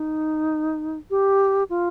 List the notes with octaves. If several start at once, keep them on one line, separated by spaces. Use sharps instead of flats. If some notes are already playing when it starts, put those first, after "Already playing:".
Already playing: D#4
G4
F4